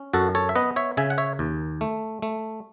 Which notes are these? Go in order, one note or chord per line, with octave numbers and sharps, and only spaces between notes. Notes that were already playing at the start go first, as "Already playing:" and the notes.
Already playing: C#4
F#2 F#4 A4
A4 C#5
E5
B3 B4 D#5
C#5 E5
C#3 E5 G#5
F#5
C#5 E5
D#2
A3
A3